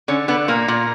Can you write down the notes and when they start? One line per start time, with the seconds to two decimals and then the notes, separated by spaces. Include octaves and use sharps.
0.08 D3 C#4
0.28 D3 B3
0.48 A#2 A#3
0.68 A#2